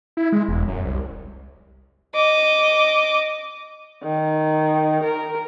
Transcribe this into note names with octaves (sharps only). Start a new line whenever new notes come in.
E4
G#3
E1
F#2
C2
D#5 D6
D#3
A#4